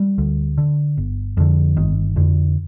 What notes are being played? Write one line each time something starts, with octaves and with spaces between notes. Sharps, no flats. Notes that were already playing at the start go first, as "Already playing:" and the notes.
Already playing: G3
D2
D3
G1
F2 D3
G1 D#3
F2 D3